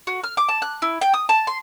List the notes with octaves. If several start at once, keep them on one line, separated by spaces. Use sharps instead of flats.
F#4
F6
D6
A5
F#6
E4
G5
D#6
A5
C6